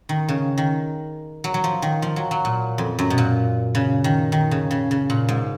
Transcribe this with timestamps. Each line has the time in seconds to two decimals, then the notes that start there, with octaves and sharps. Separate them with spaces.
0.09 D#3
0.29 C#3
0.58 D#3
1.44 F#3
1.54 F#3
1.64 F3
1.82 D#3
2.02 F3
2.16 F#3
2.31 F#3
2.45 A#2
2.78 F2
2.99 F#2
3.10 B2
3.18 A#2
3.75 C#3
4.04 D#3
4.32 D#3
4.51 C#3
4.71 C#3
4.91 C#3
5.10 A#2
5.29 G#2